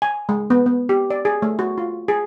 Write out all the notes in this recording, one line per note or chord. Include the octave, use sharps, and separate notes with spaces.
G#5
G#3
B3
B3
G4
D5
G#4
A3
F#4
F4
G#4